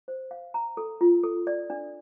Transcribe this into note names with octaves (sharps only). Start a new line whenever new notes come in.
C5
F5
A#5
A4
F4
A4
D5
D4